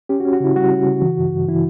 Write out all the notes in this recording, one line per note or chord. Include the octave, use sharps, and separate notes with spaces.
C#4 G4
F#4
C#4
F#4
C#3 E4
G3 F#4
C#4
C#3
E3
G2
G2
E3 E4